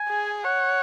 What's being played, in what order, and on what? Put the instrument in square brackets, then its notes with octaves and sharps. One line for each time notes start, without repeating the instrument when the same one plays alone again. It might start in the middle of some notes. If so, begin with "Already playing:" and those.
Already playing: [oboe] G#5
[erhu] G#4
[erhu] C#5 [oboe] F#5